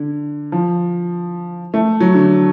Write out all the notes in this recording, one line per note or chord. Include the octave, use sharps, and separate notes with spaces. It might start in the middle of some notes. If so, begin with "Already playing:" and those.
Already playing: D3
F3
A3
F#3
D3